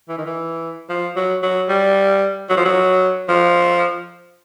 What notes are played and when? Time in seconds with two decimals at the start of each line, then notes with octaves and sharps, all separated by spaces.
0.09 E3
0.18 D#3
0.26 E3
0.89 F3
1.16 F#3
1.43 F#3
1.69 G3
2.49 F#3
2.57 F3
2.65 F#3
3.28 F3